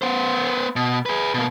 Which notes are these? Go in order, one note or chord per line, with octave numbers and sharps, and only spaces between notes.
B3 C5
B2
G#4 B4
B2 A#3